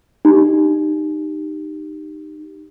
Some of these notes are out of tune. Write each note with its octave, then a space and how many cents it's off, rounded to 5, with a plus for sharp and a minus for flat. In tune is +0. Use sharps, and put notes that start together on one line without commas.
D#4 -20 G4 +0